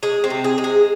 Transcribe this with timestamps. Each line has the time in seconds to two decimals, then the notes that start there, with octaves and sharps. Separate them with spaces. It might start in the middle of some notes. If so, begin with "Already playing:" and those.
0.03 G#3 G#4
0.24 C4
0.30 C3
0.44 G#4
0.58 G#3
0.64 G#4